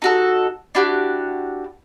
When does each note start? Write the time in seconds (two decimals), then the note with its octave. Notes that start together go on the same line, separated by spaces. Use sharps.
0.02 D#4 F#4 A4
0.75 D4 E4 F#4 G4